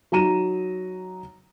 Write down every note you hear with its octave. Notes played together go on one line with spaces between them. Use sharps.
F#3 D#4 A#5 D#7 E7